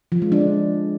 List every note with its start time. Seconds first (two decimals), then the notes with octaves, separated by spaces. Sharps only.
0.12 F3
0.22 G#3
0.32 D4